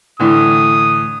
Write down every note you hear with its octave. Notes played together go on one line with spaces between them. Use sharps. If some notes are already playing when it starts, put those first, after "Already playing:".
A2 D3 E3 D#6